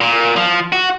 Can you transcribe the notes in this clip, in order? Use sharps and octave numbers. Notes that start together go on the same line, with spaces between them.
A#2
F3
F#4